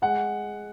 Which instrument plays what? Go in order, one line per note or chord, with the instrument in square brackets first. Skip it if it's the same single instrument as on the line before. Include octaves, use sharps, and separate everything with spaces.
[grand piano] G#3 F#5